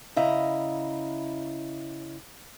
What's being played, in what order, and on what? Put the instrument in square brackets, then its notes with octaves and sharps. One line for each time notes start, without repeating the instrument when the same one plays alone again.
[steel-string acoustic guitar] C#3 E4 D#5 A#5